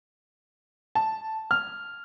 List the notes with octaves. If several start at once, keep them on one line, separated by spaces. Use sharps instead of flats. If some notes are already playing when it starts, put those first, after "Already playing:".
A5
F6